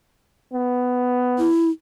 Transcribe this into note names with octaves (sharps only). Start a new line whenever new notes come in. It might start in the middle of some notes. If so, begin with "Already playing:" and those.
B3
E4